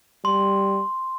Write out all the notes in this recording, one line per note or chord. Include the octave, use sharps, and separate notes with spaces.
G3 C6